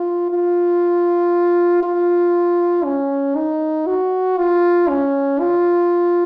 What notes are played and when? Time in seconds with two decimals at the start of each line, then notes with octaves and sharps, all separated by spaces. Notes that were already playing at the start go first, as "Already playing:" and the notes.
Already playing: F4
0.30 F4
1.83 F4
2.84 C#4
3.36 D#4
3.86 F#4
4.38 F4
4.89 C#4
5.40 F4